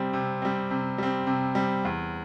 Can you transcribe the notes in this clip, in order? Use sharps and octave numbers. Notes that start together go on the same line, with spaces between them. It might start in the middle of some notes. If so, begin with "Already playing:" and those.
Already playing: C3 G3 C4
C3
G3 C4
C3
G3 C4
C3
G3 C4
E2